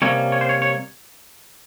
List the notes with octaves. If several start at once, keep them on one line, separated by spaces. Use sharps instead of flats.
C3 G3 A#3 C#4 C#5
C#5
C5
C#5
C#5